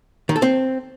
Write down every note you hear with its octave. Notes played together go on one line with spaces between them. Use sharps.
D#3
A4
C4